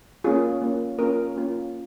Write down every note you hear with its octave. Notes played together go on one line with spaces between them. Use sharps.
A#3 C#4 F4 G#4
A#3 C#4 F4
A#3 C#4 F4 A#4
A#3 C#4 F4